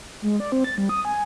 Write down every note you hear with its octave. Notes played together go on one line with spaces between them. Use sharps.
G#3
D5
C4
A6
G3
D#6
G#5